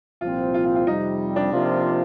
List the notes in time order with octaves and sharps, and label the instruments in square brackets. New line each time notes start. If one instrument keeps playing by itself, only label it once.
[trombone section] C2 A#2 F3 C4 [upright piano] F4
[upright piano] F4
F4
F4
[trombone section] F2 C3 G3 [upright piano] D#4
[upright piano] D4
[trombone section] C3 F3 A#3 F4